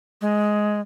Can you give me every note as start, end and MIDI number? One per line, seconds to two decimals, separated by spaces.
0.21 0.80 56